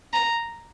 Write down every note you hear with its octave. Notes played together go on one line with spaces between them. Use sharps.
A#5